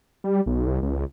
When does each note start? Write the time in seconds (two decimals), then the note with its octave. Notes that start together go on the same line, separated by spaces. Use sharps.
0.24 G3
0.46 B1
0.67 C2
0.82 C#2